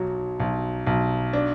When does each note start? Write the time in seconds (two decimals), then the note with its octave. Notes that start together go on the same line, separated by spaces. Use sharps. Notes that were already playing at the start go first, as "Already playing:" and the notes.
Already playing: B1 F#3 D#4
0.40 B1
0.87 B1
1.33 D4